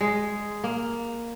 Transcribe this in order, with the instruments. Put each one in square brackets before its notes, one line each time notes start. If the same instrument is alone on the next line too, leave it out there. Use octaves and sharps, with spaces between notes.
[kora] G#3
A#3